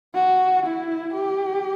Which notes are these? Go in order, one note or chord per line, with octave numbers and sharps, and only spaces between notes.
F#4
E4
G4